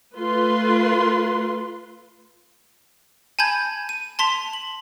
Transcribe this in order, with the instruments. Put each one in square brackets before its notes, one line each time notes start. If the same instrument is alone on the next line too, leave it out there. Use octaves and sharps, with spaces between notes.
[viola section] A3 F4 B4 C6
[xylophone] G#5 A5 B5 G6 G#6
D#7
A5 C6 B6 F7
F#7